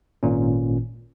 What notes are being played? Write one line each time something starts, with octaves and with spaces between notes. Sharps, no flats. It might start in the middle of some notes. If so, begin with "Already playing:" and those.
G#1 A#2 C#4